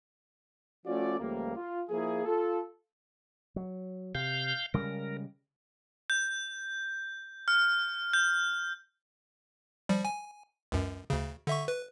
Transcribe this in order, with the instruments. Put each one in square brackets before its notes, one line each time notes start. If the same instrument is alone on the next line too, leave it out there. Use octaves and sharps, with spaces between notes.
[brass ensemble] F3 A3 C#4 F4 F#4 D5
C#2 F3 G3 A3 A#3
F4
F3 A#3 E4 G#4
F4 A4
[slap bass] F#3
[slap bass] C3 [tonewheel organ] F5 G6
[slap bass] C#3 G3 G#3 [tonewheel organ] A#4
[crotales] G6
F6
G6
[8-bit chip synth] F3 G3
G#5
C#2 F#2
D2 C#3
D3 E5 C#6
B4